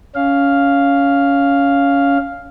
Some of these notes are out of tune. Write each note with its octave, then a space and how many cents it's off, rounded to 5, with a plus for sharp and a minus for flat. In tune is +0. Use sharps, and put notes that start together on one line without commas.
C#4 +15 F5 +0